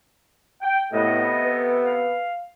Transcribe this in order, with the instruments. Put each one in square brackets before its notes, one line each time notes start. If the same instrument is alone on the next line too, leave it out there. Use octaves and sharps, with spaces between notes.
[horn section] G5
[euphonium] A2 [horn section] C3 A3 B3 [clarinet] D#5
[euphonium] B4
[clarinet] F5